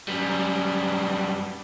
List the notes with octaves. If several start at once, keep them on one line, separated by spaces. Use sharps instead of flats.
F#2 G3